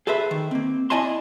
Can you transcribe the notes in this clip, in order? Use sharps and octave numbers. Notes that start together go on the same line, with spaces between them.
G#4 A4 B4 C5 E5
D#3
A#3 C4
E4 D5 D#5 G#5 A5 C6